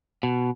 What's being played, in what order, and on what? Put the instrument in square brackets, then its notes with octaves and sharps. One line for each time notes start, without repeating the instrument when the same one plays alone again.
[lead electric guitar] B2